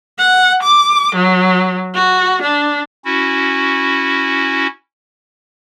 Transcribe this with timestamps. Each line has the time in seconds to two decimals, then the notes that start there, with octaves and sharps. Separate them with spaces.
0.19 F#5
0.63 D6
1.15 F#3
1.95 F#4
2.42 D4
3.05 C#4 E4 F#4